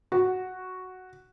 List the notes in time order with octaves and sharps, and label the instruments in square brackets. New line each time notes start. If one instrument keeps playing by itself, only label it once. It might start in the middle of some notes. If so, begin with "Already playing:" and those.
[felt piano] F#4